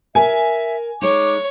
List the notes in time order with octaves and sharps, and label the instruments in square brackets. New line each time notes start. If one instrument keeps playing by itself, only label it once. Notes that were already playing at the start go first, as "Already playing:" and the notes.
[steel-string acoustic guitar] A#4 [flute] E5 [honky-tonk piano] G#5
[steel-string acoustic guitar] G#3 D#4 [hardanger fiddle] C#5 [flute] D6